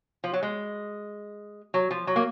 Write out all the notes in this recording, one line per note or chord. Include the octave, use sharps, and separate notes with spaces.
F3
F#3
G#3
F#3
F3
F#3
A#3